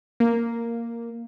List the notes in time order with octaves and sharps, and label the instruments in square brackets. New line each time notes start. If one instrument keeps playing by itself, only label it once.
[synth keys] A#3